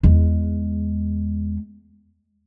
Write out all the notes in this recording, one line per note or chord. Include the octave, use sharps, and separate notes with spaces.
E2 G#3